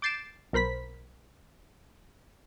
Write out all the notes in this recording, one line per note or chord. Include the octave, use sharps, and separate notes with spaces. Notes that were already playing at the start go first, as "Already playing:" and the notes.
D6 G6 A6 C7 D7 E7
B1 A#4 C5 B5 B6